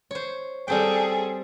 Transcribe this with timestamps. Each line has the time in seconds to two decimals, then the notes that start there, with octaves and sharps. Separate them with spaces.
0.11 C5 C#5
0.68 G3 C4 G#4 A4 G5